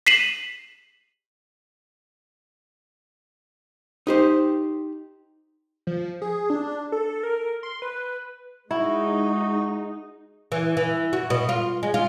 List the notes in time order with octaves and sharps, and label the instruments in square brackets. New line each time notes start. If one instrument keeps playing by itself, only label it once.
[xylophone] B6 C7 D#7 E7 F#7
[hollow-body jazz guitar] D#4 G4 C5
[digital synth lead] F3
G#4
D4
A4
A#4
C6
B4
[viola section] G#3 D#4 [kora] E4 [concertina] F#4
[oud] E3
E3
F#4
B2
F4
G#3
F4